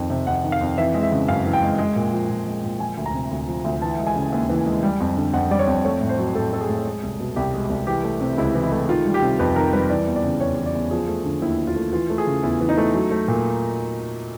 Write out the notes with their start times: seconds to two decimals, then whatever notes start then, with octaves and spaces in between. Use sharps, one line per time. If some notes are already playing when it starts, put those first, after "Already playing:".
Already playing: F2 D#3
0.10 C3
0.27 F2 F#5
0.44 D#3
0.52 F5
0.61 F2
0.78 E3 E5
0.94 G#3
1.03 E5
1.11 C#3
1.28 F#2 F5
1.45 E3
1.53 G5
1.62 G#3
1.78 G#3
1.96 A#2
2.12 F3
2.30 A#2
2.46 G#3
2.64 A#2
2.80 F3 G#5
2.97 D2
3.06 A#5
3.13 C3
3.31 D2
3.47 F3
3.65 D2
3.82 E3 A5
3.99 G#3
4.07 G#5
4.16 C#3
4.32 D#2
4.49 E3
4.66 G#3
4.83 G3
5.00 F2
5.17 D3
5.34 F2 F#5
5.51 G3 D5
5.59 C#5
5.67 F2
5.85 A3 C#5
6.01 A2
6.09 C5
6.18 F#3
6.35 A2 A4
6.52 A3 A4
6.61 G#4
6.69 A2
6.86 G#3
7.03 C2
7.20 B2
7.36 C2 G4
7.53 G#3
7.70 C2
7.87 E3 G4
8.04 A3
8.21 C3
8.38 C#2 E4
8.55 E3
8.63 E4
8.72 A3
8.89 D#3 F4
9.06 G3
9.14 G4
9.22 C3
9.39 F2 B4
9.56 D#3 A#4
9.73 G3 B4
9.90 E3 D5
10.07 E2
10.16 D5
10.23 C#3
10.40 E2 C#5
10.58 E3
10.66 D5
10.75 E2
10.91 F3 G#4
11.08 A3
11.25 D3
11.42 D#2 E4
11.59 F3
11.67 F4
11.76 A3
11.93 E3 F4
12.10 A3
12.18 G#4
12.27 C#3
12.43 E2 E4
12.60 E3
12.69 D#4
12.77 A3
12.94 F#3
13.11 A3
13.28 A#2